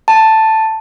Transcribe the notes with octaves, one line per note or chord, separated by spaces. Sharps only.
A5